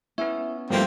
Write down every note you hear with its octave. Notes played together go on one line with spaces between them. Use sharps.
B3 C#4 E4 C#5
G2 F3 A3 A#3 C4 G4 C5